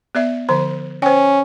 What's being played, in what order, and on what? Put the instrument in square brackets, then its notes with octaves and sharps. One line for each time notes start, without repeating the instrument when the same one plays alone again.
[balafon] B3 D5 E5
D3 F3 C5
[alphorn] C#4 [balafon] C5 G5